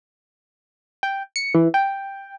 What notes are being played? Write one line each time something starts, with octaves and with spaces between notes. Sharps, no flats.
G5
C#7
E3
G5